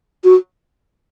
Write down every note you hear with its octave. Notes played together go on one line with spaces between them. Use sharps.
F#4